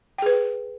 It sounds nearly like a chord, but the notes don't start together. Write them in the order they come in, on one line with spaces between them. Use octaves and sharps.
G5 G#4 B4